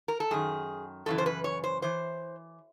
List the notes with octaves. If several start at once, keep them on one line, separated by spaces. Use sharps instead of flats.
A#4
A4
F#2 D#3 G#4
F#2 C#3 E3 A4
C5
B4
C#5
C5
E3 C5